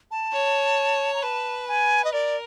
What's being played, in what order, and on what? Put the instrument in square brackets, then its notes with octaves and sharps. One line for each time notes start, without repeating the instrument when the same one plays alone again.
[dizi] A5
[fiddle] C#5
[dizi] A#5
[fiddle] B4 [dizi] A5
[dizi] G#5
D#5
[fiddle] A#4 [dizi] D5